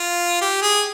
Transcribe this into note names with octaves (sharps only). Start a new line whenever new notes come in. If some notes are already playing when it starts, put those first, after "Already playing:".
Already playing: F4
G4
G#4